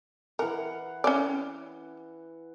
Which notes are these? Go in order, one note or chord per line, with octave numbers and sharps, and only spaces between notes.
E3 A#4 F#5
C#4 C#5 D5